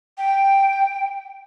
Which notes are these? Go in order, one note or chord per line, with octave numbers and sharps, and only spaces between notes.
G5